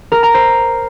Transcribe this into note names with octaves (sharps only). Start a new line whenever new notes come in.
A#4
A#5
C5